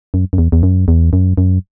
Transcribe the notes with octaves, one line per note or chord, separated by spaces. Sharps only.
F#2
F#2
E2
E2
F#2
E2
F#2
F#2